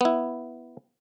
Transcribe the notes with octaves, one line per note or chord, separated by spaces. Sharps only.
B3 E4